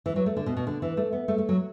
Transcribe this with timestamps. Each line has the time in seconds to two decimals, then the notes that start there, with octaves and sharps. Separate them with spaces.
0.06 E3
0.16 F#3
0.26 A3
0.36 D3
0.46 B2
0.57 B2
0.67 D3
0.82 E3
0.97 A3
1.13 B3
1.28 A3
1.38 A3
1.49 F#3